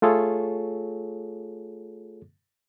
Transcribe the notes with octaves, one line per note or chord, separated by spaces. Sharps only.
A3 F4 G#4 A4 C#5